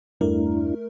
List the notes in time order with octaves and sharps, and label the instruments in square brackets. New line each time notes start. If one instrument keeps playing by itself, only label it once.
[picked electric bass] E2 G2 G3 [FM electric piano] A3 A#4 [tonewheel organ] D4 E4